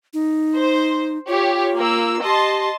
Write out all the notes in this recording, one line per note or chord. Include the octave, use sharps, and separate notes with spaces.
D#4
C5
F4 G4 C#5
A#3 E6
G4 D#5 A5 C6